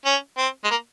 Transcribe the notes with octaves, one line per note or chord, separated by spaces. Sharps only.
C#4
C4
G#3
A#3